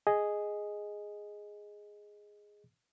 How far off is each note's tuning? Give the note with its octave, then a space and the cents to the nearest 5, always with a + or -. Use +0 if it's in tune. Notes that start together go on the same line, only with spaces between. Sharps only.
G#4 +0 D#5 +0